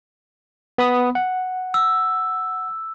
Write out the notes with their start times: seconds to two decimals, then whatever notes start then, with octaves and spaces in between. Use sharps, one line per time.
0.78 B3 B5 D#6
1.15 F#5
1.74 E6